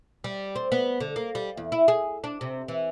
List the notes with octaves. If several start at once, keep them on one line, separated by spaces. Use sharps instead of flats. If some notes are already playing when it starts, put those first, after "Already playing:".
G3
C4
B3
D3
A#3
G3
E2
E4
G#4
D4
C3
E3